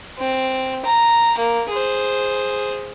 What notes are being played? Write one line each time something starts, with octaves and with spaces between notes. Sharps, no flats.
C4
A#5
A#3
G#4 C5